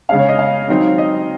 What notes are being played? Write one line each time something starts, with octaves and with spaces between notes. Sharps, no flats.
C#3 G#3 C#4 F5
C#5
D#5
F5
D#3 F#3 C4 D#4
D#5